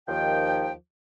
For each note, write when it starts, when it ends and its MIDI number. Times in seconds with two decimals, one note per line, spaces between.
0.07 0.71 39
0.07 0.71 51
0.07 0.71 53
0.07 0.71 79